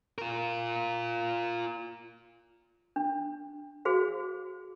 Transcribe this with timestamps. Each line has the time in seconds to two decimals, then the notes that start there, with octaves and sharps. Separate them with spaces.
0.18 F4 A#4
2.96 D4
3.85 F#4 G#4 C5 F5